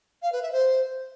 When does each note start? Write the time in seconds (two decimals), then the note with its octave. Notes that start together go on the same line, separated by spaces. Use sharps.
0.22 F5
0.32 B4
0.42 E5
0.52 C5